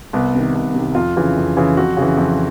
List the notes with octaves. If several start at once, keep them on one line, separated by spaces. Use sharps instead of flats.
C2 B3
C3 D#3
C2
C3 D#3
F2 F4
C#3 E3
F2
C#3 E3
F2 F#4
C#3
E3
F2